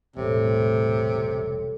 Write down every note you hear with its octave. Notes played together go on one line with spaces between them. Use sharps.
E1 C2 A2 C3 A4 C#5